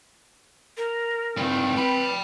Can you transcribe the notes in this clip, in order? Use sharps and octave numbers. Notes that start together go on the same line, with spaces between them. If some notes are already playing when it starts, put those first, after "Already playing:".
A#4
G2 D#3 C4
B4 G5 B5